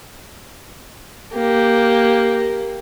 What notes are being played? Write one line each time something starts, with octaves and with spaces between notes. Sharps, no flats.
A#3 G4